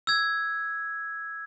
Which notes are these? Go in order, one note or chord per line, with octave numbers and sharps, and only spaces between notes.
E6 G#6